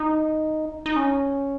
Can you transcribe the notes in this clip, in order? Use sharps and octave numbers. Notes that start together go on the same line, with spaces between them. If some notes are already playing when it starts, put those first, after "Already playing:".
Already playing: D#4
D#4
C#4